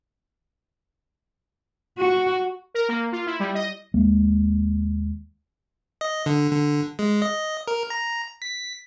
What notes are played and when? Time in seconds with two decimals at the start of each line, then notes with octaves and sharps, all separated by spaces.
1.98 F#4
2.74 A#4
2.89 A#3
3.12 F4
3.26 E4
3.40 G3
3.55 D#5
3.94 D#2 G#3 A#3
6.01 D#5
6.26 D3
6.51 D3
6.99 G#3
7.22 D#5
7.68 A#4
7.90 A#5
8.42 B6